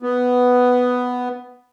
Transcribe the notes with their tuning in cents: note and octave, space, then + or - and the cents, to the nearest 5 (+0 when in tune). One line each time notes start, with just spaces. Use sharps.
B3 +5